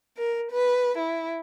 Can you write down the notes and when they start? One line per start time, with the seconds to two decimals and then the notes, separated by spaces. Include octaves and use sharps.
0.16 A#4
0.50 B4
0.98 E4